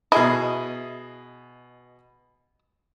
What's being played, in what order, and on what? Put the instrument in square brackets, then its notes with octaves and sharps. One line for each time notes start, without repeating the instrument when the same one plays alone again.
[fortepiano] B2 G#4 D#5 [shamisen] E4